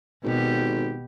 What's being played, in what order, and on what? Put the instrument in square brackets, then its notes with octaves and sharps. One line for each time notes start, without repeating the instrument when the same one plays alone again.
[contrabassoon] G#1 [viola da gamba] B2 G4